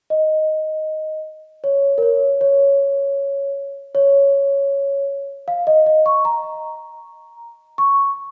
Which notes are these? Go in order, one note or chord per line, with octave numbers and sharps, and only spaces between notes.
D#5
C#5
A#4
C#5
C#5
C#5
F5
D#5
D#5
C#6
A#5
C#6